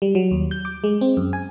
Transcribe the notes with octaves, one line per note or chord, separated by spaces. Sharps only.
G3
F#3
D#2
G6
D6
G#3
C4
F#2
G#5